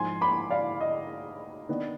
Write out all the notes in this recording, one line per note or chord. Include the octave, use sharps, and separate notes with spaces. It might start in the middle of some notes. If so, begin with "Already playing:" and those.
Already playing: G#2 F3 G#3 G#5 C6
B5 D6
D5 F5
D#5
D#3 B3 D4